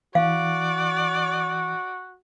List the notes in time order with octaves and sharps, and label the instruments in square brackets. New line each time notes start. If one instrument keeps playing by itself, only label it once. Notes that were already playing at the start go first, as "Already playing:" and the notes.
[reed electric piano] E3 [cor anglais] F#4 [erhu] D5 [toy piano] F5